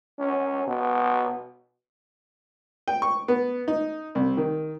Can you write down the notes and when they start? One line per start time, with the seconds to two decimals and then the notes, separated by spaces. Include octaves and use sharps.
0.19 C#4
0.67 B2
2.88 G5
3.02 C#6
3.28 B3
3.68 D#4
4.15 C2
4.37 D#3